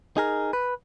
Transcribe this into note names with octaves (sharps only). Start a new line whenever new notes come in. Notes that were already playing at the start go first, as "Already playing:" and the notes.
D#4 G#4 A#4
B4